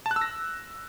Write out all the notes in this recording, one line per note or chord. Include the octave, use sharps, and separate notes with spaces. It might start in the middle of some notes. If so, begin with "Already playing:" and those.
A5
F#6
E6
A#6